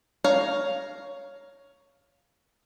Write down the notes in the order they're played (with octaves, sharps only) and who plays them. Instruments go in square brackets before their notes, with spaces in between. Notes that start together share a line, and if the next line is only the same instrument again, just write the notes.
[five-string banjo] C#5 F5 A#5